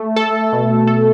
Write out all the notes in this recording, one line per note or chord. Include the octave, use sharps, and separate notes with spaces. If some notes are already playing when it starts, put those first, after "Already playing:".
Already playing: A3
A4
B2
A4